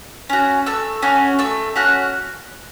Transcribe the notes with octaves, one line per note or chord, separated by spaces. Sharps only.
C#4 F#4
A3 E6
C#4 F#4
A3 E6
C#4 F#4 F#6